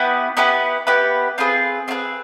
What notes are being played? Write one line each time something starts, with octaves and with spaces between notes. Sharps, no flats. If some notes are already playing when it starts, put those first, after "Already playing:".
Already playing: B3 E4 G4 B4
B3 E4 G4 B4
B3 E4 G4 B4
C4 F4 G#4 B4
C4 F4 G#4 B4